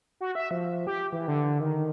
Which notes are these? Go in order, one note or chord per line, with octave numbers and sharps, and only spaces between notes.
F#4
E5
F3
G4
E3
D3
D#3